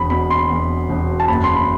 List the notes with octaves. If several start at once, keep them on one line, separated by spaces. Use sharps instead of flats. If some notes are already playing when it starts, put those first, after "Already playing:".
Already playing: E1 B5
B2 B5
C6
E2
E1
A5
F#1 B5
C6
B5